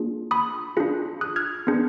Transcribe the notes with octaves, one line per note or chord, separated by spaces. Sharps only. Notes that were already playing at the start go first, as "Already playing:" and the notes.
Already playing: A#3 D4 F4 G#4
B5 D#6
D4 F4 G#4
D#6 F#6
F6 G#6
B3 D4 G#4